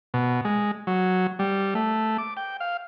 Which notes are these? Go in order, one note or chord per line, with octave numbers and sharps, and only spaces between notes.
B2
G#3
F#3
G3
A3
D6
G5
F5